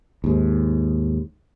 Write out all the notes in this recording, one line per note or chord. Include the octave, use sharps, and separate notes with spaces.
D#2 G#2